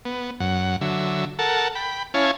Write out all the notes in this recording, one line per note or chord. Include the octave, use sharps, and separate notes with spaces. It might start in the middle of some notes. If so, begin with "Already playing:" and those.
B3
F#2 F#5
D3 F#3 E5
A4 A#4 F#5 A5
G5 B5
C#4 E4 C#5 F5 G#5 A5